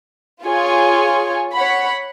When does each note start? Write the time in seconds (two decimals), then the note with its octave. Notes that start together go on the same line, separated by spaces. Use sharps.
0.44 F4 G#4 C#5 G#5
1.54 C#5 F#5 B5